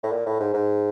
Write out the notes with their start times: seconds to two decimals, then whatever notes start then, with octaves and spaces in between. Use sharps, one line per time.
0.03 A2
0.12 A#2
0.26 A2
0.40 G#2
0.54 G#2